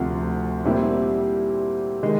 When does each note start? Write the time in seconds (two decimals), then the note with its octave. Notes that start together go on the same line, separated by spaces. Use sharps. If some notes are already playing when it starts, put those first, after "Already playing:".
Already playing: D2 C3 F3
0.64 A#2 G3 C4 E4 G4
2.02 D#3 G#3